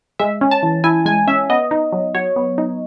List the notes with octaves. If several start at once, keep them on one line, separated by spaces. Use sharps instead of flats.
G#3 E5
C#4
A5
E3
E4 G#5
G#3 G#5
C#4 E5
B3 D#5
D#4
F#3
F#3 C#5
B3
D#4